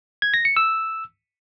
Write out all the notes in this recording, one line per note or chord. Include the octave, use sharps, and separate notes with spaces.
G#6
A#6
C#7
E6